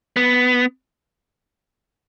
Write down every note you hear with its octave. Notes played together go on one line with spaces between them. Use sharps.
B3